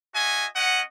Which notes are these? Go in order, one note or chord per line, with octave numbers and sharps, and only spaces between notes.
F#4 D#5 E5 G#5
C#4 D#5 F#5